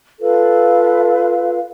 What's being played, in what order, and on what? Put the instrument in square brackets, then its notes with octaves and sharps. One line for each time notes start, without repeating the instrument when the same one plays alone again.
[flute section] F4 A4 B4 F5